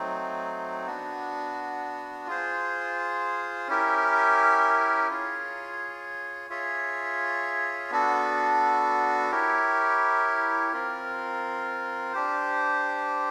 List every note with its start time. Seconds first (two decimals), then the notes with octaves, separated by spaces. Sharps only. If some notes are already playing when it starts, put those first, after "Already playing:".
Already playing: F#3 A3 C4 D#4
0.86 B3 D4 F#4
2.27 F4 G#4 C5
3.68 C#4 E4 G4 A#4
5.10 F4 G#4 C#5
6.50 F4 G#4 C#5 E5
7.91 B3 D4 F#4 A4
9.32 E4 G4 A#4 C#5
10.72 C4 F4 A#4
12.13 D4 G4 C5